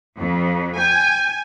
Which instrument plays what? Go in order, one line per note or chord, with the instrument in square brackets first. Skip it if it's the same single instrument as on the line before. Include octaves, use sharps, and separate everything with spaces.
[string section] F2
[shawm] G5 [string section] G#5